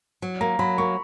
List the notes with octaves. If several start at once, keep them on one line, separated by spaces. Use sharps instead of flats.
F#3
A#3 A#5
F#3 B5
A#3 C#6